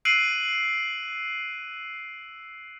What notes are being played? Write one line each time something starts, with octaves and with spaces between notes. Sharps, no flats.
E6 F#6 C7 D7 D#7 F#7